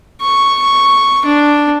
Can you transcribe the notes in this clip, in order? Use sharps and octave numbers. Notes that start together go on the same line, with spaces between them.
C#6
D4